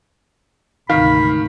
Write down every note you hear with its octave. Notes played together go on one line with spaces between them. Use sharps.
D2 G#2 C3 D#3 F5 B5